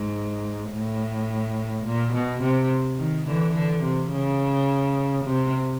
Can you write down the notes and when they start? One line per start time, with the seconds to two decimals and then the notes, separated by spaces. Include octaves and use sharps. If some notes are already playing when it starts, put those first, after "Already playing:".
Already playing: G#2
0.71 A2
1.85 A#2
2.13 B2
2.42 C3
2.99 D#3
3.27 D3 E3
3.55 D3
3.84 C3
4.12 C#3
5.25 C3